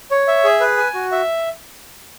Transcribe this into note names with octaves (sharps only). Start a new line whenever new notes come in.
C#5
E5
G#4
B4
G#5
F#4
E5